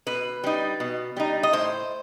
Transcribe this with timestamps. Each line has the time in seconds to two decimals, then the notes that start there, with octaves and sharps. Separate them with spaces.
0.06 B2 B4
0.44 G3 D#4
0.80 B2
1.17 G3 D#4
1.43 D#5
1.53 A2 C5